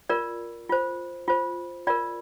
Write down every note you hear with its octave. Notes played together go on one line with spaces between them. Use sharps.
F4 A#4 D5
F4 C5
F4 C5
F4 A#4 D5